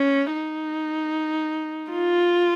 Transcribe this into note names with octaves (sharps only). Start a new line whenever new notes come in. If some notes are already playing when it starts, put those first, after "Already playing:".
Already playing: C#4
D#4
F4